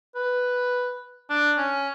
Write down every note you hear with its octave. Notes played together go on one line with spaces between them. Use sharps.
B4
D4
C#4